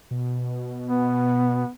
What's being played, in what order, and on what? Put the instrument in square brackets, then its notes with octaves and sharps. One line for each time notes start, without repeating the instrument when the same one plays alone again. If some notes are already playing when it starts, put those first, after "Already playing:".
[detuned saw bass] B2
[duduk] B3